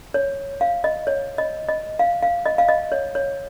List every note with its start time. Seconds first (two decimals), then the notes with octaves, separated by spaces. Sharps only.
0.14 C#5
0.61 F5
0.84 D#5
1.07 C#5
1.38 D#5
1.69 D#5
1.99 F5
2.23 F5
2.46 D#5
2.58 F5
2.68 D#5
2.92 C#5
3.15 C#5